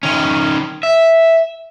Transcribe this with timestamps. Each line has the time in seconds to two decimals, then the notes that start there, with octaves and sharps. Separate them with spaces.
0.03 D#3 C#4
0.83 E5